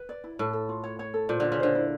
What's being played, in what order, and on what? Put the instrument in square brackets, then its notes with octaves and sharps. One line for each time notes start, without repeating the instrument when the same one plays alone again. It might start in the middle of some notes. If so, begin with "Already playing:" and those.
Already playing: [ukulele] B4
D5
E4
[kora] A2 [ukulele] A4
[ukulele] A4
F4
C#5
C#5
A4
[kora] A#2 [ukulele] C5
[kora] D3 [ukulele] F4
[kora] C#3
[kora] D3 [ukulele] C5
[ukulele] E4